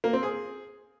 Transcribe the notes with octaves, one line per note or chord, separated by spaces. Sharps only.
A#3
C4
G#4